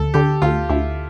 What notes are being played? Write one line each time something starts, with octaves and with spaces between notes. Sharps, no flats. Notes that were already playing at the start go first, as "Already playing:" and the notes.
Already playing: D2 A4
D3 G4
D2 F4
D2 E4